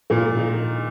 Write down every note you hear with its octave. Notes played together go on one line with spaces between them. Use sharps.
A#2 A#3
D#3 D#4